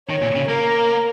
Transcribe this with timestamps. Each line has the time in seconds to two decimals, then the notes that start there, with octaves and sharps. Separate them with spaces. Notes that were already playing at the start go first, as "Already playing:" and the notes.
0.09 D#3 C#5
0.22 A#2
0.36 C#3
0.48 A#3 A#4